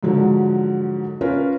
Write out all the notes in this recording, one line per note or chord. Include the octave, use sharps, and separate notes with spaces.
G#2 D3 F3 F#3
C#4 F4 A#4 B4